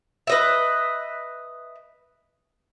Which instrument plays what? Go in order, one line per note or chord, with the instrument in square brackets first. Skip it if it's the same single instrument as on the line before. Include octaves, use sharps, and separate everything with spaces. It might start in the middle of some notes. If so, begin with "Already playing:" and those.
[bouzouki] B4 D#5 E5